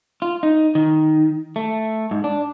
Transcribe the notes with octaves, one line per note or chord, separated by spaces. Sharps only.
F4
D#4
D#3
A3
G#2
D4